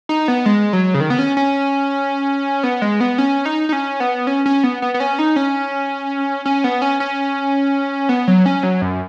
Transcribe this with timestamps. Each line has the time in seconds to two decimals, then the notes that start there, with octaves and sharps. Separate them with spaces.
0.09 D#4
0.28 B3
0.46 G#3
0.73 F#3
0.94 C#3
1.00 D#3
1.10 B3
1.19 C#4
1.37 C#4
2.63 B3
2.82 G#3
3.00 B3
3.18 C#4
3.45 D#4
3.69 D#4
3.73 C#4
4.00 B3
4.27 C#4
4.46 C#4
4.64 B3
4.82 B3
4.94 B3
5.00 C#4
5.19 D#4
5.36 C#4
6.45 C#4
6.64 B3
6.82 C#4
7.00 C#4
8.09 B3
8.28 F#3
8.46 C#4
8.63 F#3
8.82 F#2